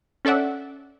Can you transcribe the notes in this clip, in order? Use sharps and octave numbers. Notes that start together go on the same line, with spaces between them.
C#4 A4 D5 E5 F#5